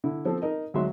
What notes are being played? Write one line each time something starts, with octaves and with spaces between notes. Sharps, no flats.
D3 E4
F3 C4 A4
D#4 A#4 D#5
D2 F#3 G#3 F#4 E5 C6